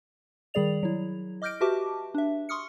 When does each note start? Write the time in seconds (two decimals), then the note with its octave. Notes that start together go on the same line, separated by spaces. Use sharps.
0.54 D#3 G3 G#4 D5 F7
0.83 F#3 E4
1.42 D#5 D6 F6 G6 A#6 D7
1.61 F#4 G4 B4 E5 A5 D6
2.14 D4 E5
2.49 C6 C#6 D#6 F6 C#7